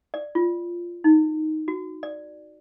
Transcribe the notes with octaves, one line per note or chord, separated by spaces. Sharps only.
D5
F4
D#4
F#4
D5